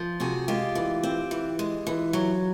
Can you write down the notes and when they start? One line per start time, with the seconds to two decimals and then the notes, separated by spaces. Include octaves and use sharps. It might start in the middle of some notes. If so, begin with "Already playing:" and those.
Already playing: F3
0.20 C3 F#4 G#4
0.48 G#3 F4 G4
0.75 E3
1.03 C4
1.31 E3
1.59 G#3
1.87 E3
2.13 F#3